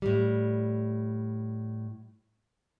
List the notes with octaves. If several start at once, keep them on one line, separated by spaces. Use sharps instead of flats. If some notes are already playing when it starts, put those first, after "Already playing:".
A2 G3